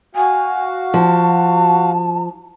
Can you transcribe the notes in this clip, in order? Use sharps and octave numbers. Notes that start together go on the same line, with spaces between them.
F#4 F5 G#5
F3 A5